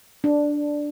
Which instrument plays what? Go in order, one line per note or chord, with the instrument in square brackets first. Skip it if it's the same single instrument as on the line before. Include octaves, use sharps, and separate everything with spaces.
[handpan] D4